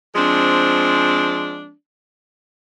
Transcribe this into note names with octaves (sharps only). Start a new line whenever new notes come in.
F3 G#3 C4 D4